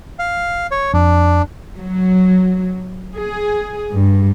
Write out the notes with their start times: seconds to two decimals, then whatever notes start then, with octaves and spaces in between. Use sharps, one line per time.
0.19 F5
0.71 C#5
0.94 F2 D4
1.77 F#3
3.16 G#4
3.92 G2